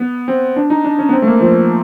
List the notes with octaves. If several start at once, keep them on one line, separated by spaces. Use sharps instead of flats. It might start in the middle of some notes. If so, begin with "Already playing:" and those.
Already playing: B3
C4
D4
D#4
D4
C#4
B3
C4
A3
A#3
F3